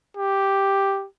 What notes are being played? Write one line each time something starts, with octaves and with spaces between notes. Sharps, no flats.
G4